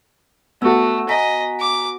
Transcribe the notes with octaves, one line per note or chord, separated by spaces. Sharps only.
A3 B3 F#4 E6
D#5 G#5 A#5 B6
D6